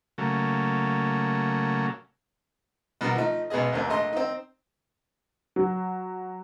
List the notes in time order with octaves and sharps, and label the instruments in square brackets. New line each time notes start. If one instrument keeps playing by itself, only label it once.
[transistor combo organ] C#3 F#3 A3 A#3
[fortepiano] B2 G3 D4 F#4 A#4
F3 A3 D#4
G#1 B2 B3 G#4 D#5
A1 D#2 C4
A#1 A3 D#5 C6
C4 D#4
[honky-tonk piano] F#3